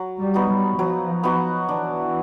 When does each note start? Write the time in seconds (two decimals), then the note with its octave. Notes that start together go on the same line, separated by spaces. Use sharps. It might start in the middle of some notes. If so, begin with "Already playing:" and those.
Already playing: F#3
0.19 G3
0.34 B3 D#4 F#4
0.50 G3
0.79 F3 F#3
1.23 B3 D#4 F#4
1.68 E3 D4